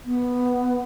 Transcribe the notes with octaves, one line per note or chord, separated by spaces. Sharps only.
B3